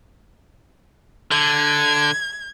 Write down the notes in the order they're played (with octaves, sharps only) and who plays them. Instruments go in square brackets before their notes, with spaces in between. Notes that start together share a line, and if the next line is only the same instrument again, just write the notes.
[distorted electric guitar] D3 [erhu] G#6